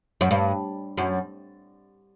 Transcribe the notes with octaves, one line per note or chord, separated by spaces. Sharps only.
F#2
G2
F#2